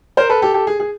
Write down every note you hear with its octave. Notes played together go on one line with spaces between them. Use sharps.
A#4 C5
A4 B4
G4 A4
G4 A4
G#4
G#4